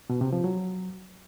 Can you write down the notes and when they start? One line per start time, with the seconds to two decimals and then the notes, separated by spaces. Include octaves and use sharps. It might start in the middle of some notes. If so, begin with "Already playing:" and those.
0.10 B2
0.21 C3
0.33 F3
0.44 F#3